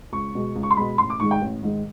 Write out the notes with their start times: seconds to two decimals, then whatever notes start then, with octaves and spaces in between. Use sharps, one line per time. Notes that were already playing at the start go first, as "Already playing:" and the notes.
0.13 C#2 C#6
0.35 B2 G#3
0.56 C#2
0.63 C#6
0.71 C6
0.77 B2 G#3 B5
0.98 A1 C6
1.10 D6
1.20 G#2 D#3 G#3 C#6
1.31 G5
1.41 A1
1.63 G#2 D#3 G#3